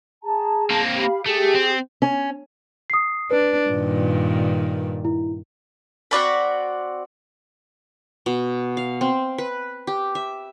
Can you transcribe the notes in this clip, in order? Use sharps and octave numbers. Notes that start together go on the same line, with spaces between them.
G#4 A5 A#5
A#3 C4
G4 F5 B5
A3 G4 G#4
C4
C#4
D#6 C7
D4 B4
G2 A#2 D#3
E4
C4 F#4 D5 B5
B2
F5
C4
B4
G4
E5